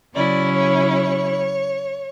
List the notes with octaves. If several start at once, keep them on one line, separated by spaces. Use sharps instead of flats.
C#3 F#3 C#4 E4 D5
C#5